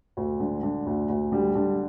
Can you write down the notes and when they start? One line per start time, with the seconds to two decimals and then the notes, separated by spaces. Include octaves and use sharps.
0.17 D2
0.40 D3
0.63 D3
0.86 D2
1.09 D2
1.32 D3 G3
1.55 D3